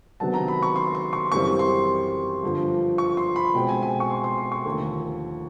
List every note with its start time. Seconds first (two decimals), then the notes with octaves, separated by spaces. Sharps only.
0.20 C3 D#3 F#3 B3 D4 A5
0.34 A#5
0.48 B5
0.63 C#6
0.76 C6
0.95 C6
1.13 C#6
1.32 F#2 C#3 E3 G3 C4 C#6
1.59 C6
2.43 G2 D3 F3
2.98 C#6
3.17 C6
3.36 B5
3.54 B2 G#3 C4 G5
3.69 G#5
3.83 G#5
4.00 C#6
4.10 C6
4.24 C6
4.38 C6
4.52 C#6
4.65 D#2 D3 F3 A3